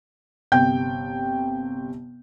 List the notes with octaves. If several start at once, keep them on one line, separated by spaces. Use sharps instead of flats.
G1 C3 G5 G6